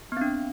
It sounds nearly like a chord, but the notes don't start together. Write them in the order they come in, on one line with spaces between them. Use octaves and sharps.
B3 C4 D4